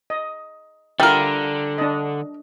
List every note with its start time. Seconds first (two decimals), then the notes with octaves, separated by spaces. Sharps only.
0.10 D#5
1.00 D3 G3 F4 A#4 E5
1.78 D4 D#5